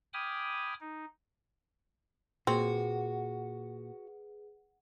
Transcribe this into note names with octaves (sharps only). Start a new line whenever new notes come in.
G5 G#5 B5 D6 D#6 F6
D#4
A#2 C4 F#4 G#4 B4